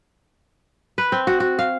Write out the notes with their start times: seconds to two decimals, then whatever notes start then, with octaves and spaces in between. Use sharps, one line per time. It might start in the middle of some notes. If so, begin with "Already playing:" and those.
0.98 B4
1.12 C4
1.27 F#4
1.40 F#4
1.59 F5